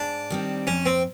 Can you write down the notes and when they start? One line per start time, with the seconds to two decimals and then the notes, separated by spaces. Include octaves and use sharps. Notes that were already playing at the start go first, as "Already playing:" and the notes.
Already playing: G#2 D4
0.30 D#3 G3 C4
0.67 F2 C#4
0.86 C4